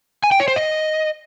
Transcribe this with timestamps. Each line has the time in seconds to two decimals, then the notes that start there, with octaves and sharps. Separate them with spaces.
0.24 G#5
0.32 G5
0.40 C#5
0.48 C5
0.56 D#5